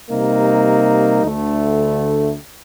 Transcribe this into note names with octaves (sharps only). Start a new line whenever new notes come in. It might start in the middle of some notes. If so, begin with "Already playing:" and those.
C3 G3 A#3 D#4
D2 D3 A3